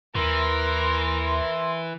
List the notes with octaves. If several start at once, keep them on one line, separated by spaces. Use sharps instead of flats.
D#2 E3 A#4 C6